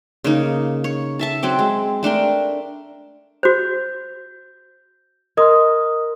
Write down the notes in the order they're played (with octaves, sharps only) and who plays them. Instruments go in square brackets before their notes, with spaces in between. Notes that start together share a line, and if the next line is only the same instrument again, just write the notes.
[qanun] C#3 A#3 D#4
C#5
A4 E5 A5
F#3 C4 G5 D6
G#3
A3 D4 A#4 G5
[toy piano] F#4 C5 [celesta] G6
[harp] A#4 C6 F6 [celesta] D#5 D#6